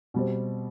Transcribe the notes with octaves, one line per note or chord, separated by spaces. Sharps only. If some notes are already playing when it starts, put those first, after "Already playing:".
B2 G3 C4